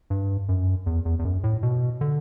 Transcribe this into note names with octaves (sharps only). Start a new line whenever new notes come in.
G2
F#2
E2
E2
E2
F#2
A2
B2
D3